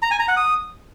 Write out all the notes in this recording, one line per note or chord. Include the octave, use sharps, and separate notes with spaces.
A#5
G#5
A#5
F#5
D#6